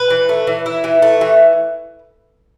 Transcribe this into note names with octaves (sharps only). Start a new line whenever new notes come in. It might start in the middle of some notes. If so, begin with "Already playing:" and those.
Already playing: B4
E3
A3
E3
E4
E3
A3
E3